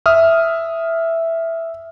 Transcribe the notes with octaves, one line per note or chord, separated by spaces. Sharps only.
E5 D#6 F6